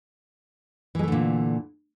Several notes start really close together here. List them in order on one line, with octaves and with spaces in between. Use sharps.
E3 G#3 A3 D3 A#2